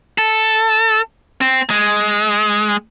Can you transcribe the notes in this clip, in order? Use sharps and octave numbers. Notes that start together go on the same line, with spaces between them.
A4
C4
G#3